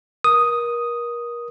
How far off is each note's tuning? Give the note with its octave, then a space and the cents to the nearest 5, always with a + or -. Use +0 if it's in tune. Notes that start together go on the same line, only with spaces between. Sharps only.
A#4 +30 D#6 +0